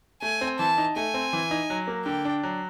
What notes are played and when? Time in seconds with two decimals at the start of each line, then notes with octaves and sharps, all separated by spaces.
0.22 A3 G#5
0.41 C4
0.59 E3 A5
0.78 D#4
0.96 A3 G#5
1.14 C4
1.33 E3
1.51 D#4
1.70 F#3
1.88 A#3
2.06 D3 G5
2.25 D4
2.43 F#3